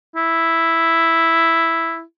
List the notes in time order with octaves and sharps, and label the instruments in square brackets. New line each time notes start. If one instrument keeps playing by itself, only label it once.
[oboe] E4